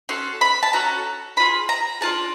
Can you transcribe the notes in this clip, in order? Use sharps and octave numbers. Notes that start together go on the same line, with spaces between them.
C#4 F#4 A4 C6
B5
A5
C#4 F#4 A4 A#5
D4 F4 G#4 B5
A#5
D4 F4 G#4 A5